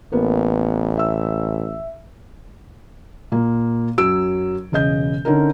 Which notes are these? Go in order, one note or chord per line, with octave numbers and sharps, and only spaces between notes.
A1 A#3 B3
E5 E6
A#2 A#3
F#2 F#3 E6 D7
E1 C#3 D#5 G6
D3 C#4 D#4 A#4